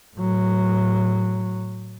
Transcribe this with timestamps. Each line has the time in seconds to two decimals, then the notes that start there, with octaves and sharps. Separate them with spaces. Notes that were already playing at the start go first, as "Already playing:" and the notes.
0.16 A2 F#3